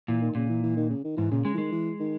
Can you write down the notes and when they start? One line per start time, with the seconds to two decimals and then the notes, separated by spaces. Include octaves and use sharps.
0.08 A#2 E3
0.22 D#3
0.35 A#2 C#3
0.49 E3
0.63 E3
0.77 D#3
0.90 C#3
1.04 D#3
1.17 G#2 E3
1.31 A#2 C#3
1.45 C#3 G#3
1.54 E3
1.58 D#3 G#3
1.72 E3
2.00 D#3